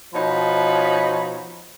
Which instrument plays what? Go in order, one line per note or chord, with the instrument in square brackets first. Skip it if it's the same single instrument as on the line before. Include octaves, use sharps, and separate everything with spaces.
[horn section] B2 F3 D#4 C#5 B5